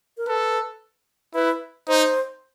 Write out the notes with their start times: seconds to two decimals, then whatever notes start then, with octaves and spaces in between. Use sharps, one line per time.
0.17 A#4
0.27 A4 B4
1.34 E4 B4
1.88 D#4 C5